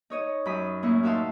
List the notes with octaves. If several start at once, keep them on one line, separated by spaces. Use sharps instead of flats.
D#4 C#5 D#5
F#2 B5 D#6
A2 A#3 C#4 E4 C#6
D#4 F#4 E5 F5 A5 C6